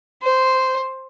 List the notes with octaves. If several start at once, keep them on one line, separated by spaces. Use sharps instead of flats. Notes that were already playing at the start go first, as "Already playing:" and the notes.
C5